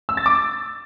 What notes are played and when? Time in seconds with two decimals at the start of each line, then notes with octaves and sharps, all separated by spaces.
0.09 E6
0.17 A6
0.26 D6